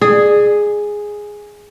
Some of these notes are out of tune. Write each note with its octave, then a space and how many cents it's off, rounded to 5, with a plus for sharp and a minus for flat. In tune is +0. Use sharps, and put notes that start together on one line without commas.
G#4 +0 D5 +30